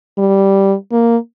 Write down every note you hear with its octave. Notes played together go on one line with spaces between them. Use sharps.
G3
A#3